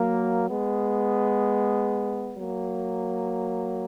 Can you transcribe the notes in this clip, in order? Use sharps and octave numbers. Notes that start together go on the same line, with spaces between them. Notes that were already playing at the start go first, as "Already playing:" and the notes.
Already playing: F#3 A#3
G#3 B3
F#3 A#3